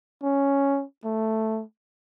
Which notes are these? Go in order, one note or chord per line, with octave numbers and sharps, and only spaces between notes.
C#4
A3